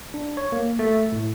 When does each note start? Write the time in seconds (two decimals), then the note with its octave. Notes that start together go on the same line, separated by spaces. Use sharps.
0.14 D4
0.37 C#5
0.52 A#3
0.79 A3
1.12 A2